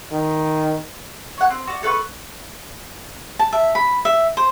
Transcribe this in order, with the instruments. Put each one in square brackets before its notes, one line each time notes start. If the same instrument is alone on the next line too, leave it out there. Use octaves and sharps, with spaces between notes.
[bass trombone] D#3
[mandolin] C#5 F#5
C4
F#4 D5
A4 B4 F5 C#6
[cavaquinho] A5
E5
B5
E5
C5